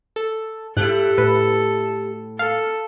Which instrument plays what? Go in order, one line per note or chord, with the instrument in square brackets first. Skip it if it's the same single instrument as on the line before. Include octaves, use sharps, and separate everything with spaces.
[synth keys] A4
[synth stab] G#2 [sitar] E4 G4 [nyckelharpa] A4 [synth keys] F#6
[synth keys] A2 [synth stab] B4
[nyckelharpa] A4 [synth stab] F5